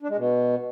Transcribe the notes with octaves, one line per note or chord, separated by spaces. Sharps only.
D4
G#3
B2